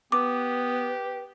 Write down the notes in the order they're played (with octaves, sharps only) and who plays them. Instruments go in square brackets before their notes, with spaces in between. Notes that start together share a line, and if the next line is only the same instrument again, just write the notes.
[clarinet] B3 [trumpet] G4 [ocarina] B4 [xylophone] D6